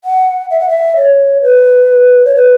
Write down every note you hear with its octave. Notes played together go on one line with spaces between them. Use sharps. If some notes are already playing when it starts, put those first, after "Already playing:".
F#5
E5
F#5
E5
C#5
B4
C#5
B4